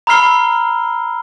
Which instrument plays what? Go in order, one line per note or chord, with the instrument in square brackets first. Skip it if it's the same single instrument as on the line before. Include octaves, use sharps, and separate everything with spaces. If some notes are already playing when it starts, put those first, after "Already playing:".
[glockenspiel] A#5 B5 E6 F6 C7 G7